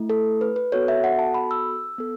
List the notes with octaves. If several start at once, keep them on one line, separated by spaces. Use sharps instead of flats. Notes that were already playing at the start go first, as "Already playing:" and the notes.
Already playing: A3 E4
A4
B4
B4
B3 F#4 A4 C#5
E5
F#5
A5
B5
E6
B3 A4